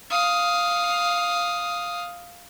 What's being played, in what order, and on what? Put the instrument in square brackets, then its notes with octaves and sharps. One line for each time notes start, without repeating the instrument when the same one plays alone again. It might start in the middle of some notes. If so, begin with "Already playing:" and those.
[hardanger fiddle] F5 D#6